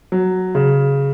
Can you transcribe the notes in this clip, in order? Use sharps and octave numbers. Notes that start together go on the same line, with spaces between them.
F#3
C#3